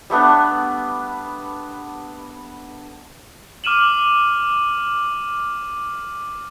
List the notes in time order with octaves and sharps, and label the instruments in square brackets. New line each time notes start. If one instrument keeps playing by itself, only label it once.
[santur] G3 A3 B3 D4
[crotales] D6 F6 D#7 E7 F#7